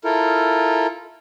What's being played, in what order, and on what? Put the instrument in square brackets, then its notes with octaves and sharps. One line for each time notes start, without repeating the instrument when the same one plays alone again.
[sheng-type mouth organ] E4 F4 A4 A#4